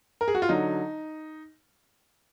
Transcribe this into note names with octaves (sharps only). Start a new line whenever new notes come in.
A#4
G#4
F#4
F4
D3 F#3 D#4